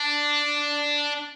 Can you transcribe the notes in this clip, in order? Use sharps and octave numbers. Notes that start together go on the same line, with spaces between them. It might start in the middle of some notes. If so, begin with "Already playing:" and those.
Already playing: D4